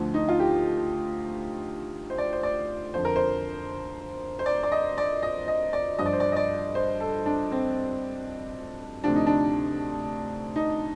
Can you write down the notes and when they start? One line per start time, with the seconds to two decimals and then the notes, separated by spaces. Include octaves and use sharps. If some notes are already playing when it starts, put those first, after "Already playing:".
Already playing: D2 D3 F3
0.14 D#4
0.29 F4
0.40 G4
2.10 C5
2.18 D5
2.33 C5
2.43 D5
2.94 F2 D3 F3 C5
3.05 A#4
3.16 C5
4.39 C5
4.46 D5
4.63 D5
4.72 D#5
4.98 D5
5.22 D#5
5.48 D#5
5.73 D5
5.99 G2 F3 D#5
6.06 D5
6.13 C5
6.20 D5
6.32 D#5
6.36 D5
6.75 C5
7.00 A4
7.26 D4
7.52 C4
9.04 D2 C3 F3 D4
9.15 D#4
9.26 D4
10.56 D#4